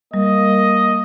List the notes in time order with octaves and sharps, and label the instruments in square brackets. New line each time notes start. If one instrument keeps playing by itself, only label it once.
[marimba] G3 [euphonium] A#3 [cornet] D#5